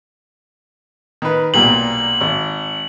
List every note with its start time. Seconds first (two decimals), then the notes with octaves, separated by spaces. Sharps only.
1.22 D#3 B4
1.54 B1 A#2 G3 F#7
2.21 G#1